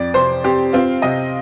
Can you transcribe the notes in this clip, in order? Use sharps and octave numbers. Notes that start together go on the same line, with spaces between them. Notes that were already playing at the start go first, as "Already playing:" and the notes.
Already playing: F2 D5
C3 C5 C6
C4 G4 G5
C4 F4 F5
C3 D#5